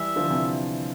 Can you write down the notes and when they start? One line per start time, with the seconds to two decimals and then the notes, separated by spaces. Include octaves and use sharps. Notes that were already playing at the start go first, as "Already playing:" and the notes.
Already playing: E3 G3 E5
0.16 D3 F3
0.30 C3 E3